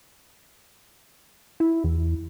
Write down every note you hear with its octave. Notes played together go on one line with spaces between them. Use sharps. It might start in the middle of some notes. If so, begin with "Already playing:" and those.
E4
E2